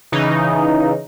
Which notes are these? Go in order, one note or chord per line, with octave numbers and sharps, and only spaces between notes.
C#3 E3 D#4